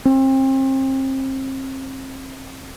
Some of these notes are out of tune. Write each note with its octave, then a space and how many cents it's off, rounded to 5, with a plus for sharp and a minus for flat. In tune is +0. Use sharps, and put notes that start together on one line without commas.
C4 +35